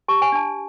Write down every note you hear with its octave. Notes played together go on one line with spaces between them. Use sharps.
G4 A5
G#5
D4 A5